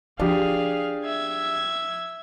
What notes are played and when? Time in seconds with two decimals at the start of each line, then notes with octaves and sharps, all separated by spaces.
0.20 F3 D4 G4 G#4 F5
1.06 E5 G#6